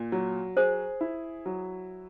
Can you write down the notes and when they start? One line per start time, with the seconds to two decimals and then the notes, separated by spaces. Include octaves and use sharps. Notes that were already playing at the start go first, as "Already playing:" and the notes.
Already playing: A#2
0.12 F#3
0.57 G#4 C5
1.01 E4
1.46 F#3